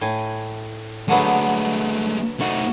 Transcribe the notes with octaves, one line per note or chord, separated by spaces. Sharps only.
A2 G#5
D3 F#3 G#3 A3 B3
A3 D#4 F#4